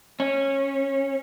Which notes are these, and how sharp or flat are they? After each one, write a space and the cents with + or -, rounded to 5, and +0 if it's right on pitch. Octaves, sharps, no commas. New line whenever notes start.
C#4 -20